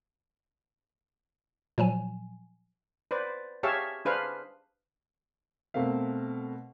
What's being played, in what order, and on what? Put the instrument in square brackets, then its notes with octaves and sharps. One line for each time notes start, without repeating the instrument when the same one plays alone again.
[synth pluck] A#2 F3 F#3 G#5
[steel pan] B4 C5 D5
G4 G#4 C#5 E5 F5 A5
D4 G#4 B4 C5 F5 B5
[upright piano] B2 A3 C4 A#4 F5